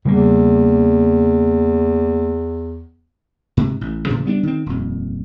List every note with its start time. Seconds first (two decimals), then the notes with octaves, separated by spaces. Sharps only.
0.05 E2 C#3 G3 A#3
3.57 G#2 C3
3.81 A1
4.06 A2 C#3 E3 F3
4.25 G3 B3 C4 D4
4.43 D#3 C4
4.66 D#1 F2